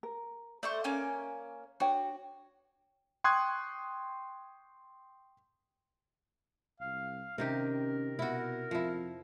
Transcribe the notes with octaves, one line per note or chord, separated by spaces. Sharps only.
A#4
A3 C5 D5 C#6
A#3 C#4 G#5
D4 F#4 C#5 G5
G5 C6 C#6 D#6 F#6 G#6
C2 F5
C3 D#3 C#4 G4 A#4
B2 E4 F#4
F2 F3 E4